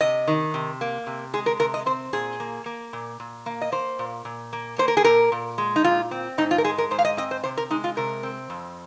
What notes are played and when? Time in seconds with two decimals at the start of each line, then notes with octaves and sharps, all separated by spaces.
0.01 C3 D#5
0.27 D#3
0.54 C3
0.81 A#3
1.07 C3
1.33 G#3 G#4
1.46 A#4
1.59 C3 A#4
1.74 D#5
1.86 C4 C5
2.13 A#2 G#4
2.40 A#3
2.66 A#3
2.93 A#2
3.20 A#2
3.46 A#3
3.61 D#5
3.72 A#3 C5
3.99 A#2
4.25 A#2
4.53 A#3
4.78 A#3 C5
4.88 A#4
4.97 G#4
5.04 A#2 A#4
5.32 A#2
5.58 G#3
5.76 D#4
5.84 A#2 F4
6.11 C4
6.38 G#2 D#4
6.51 F4
6.58 A#4
6.64 G#3 G#4
6.78 A#4
6.91 G#2 C5
6.99 F5
7.05 D#5
7.17 C4 D#5
7.31 C5
7.44 C3 C5
7.57 A#4
7.70 G#3 D#4
7.84 F4
7.97 C3 A#4
8.23 C4
8.50 F2